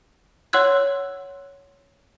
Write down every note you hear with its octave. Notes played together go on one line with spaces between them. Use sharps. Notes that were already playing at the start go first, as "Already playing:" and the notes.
C#5 F#5 C6 E6 F#6 G#6